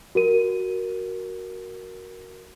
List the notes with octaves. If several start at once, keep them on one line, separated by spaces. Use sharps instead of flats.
F#4 A#4 D#7